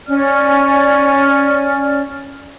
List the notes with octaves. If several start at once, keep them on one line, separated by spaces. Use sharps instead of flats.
C#4 D5 F6